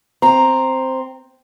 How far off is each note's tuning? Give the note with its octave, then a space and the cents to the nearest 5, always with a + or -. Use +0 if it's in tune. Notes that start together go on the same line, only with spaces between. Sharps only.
C4 +0 A#5 +0